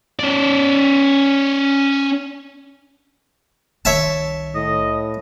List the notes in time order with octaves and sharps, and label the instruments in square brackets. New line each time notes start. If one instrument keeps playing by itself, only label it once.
[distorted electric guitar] C#4 D5
[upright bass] C2 D#3 [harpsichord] C#5 E5 A5
[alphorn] A2 [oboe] D#5